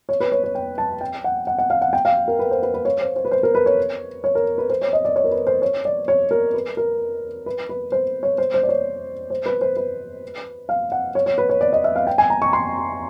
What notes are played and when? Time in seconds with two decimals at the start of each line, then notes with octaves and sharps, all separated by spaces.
0.09 C#5
0.20 B4
0.32 C#5
0.44 C#5
0.55 G5
0.78 A5
1.01 G5
1.24 F#5
1.47 F#5
1.58 F#5
1.70 F5
1.82 F#5
1.93 G5
2.05 F5
2.28 A#4
2.39 B4
2.51 C5
2.63 B4
2.74 B4
2.85 C#5
3.01 C5
3.16 C5
3.25 B4
3.31 C5
3.43 A#4
3.55 B4
3.66 C#5
4.24 C#5
4.35 A#4
4.58 B4
4.70 C5
4.82 C#5
4.93 D#5
5.05 D5
5.16 C#5
5.24 A#4
5.31 B4
5.47 C5
5.62 C#5
5.85 D5
6.08 C#5
6.31 A#4
6.54 B4
6.77 A#4
7.46 B4
7.69 B4
7.92 C5
8.23 C#5
8.38 C5
8.54 C5
8.63 D5
8.69 C#5
9.30 C5
9.46 B4
9.61 C5
9.77 B4
10.69 F5
10.92 F#5
11.15 C#5
11.26 C#5
11.38 B4
11.49 C#5
11.61 D5
11.73 D#5
11.84 E5
11.96 F5
12.07 G5
12.18 G#5
12.30 A#5
12.42 C#6
12.53 C6